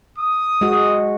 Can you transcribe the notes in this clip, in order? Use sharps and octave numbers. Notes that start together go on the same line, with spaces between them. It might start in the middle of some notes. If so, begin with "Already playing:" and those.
D#6
G#3 F#4